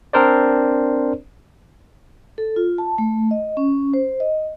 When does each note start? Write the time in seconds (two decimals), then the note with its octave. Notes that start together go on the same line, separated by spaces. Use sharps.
0.13 C4 D4 A#4 C5 D5
2.38 A4
2.56 F4
2.78 A5
2.98 A3
3.31 D#5
3.57 C#4
3.94 C5
4.20 D#5